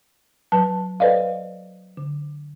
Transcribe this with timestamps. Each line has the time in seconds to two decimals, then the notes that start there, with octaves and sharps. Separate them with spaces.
0.52 F#3 B4 A5
1.00 A4 B4 C5 D5 D#5 F5
1.97 D3